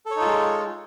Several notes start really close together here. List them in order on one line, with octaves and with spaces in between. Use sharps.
A4 C#5 D#4 F4 G#3